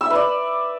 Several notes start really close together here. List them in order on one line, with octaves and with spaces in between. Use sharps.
E6 E5 B4 D5